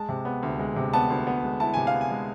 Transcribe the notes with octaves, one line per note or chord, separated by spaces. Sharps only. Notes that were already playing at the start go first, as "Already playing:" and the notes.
Already playing: G#3 A5
C3
B3
D2
G#3
C3
B3 A5
D2
B3
G#3
E4 A5
C3 G#5
F5
B3
G#5
G#3